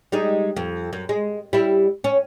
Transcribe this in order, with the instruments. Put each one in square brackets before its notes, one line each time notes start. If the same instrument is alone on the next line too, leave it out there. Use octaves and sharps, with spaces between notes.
[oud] G3 G#3 D#4
F2
F#2
G#3
G3 E4
C#4